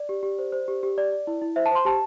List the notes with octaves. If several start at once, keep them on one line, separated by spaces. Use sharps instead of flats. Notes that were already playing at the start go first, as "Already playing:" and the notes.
Already playing: D5
G4
G4
C5
C5
G4
G4
D5
D5
E4
E4
C5 E5
A5
C5 C6
G4 A5